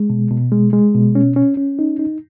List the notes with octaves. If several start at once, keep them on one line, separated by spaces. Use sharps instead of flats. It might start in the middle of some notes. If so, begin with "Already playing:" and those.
Already playing: G#3
B2
B2
G#3
G#3
B2
C#4
C#4
C#4
D#4
D#4